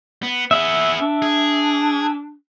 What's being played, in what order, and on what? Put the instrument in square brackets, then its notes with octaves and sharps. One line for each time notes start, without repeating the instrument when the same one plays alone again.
[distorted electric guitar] B3
[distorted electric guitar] B3 G#4 [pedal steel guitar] E5
[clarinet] D4
[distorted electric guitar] G#4